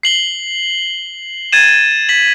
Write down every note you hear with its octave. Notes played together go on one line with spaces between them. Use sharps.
C7 F#7 G7
G#6 A6 D#7 E7
B6 F#7